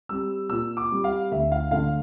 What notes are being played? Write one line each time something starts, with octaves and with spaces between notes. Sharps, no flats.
G3 C4 E6
A#2 E6
D6
G3 C4
F5
D2 E5
F5
D3 A3 F5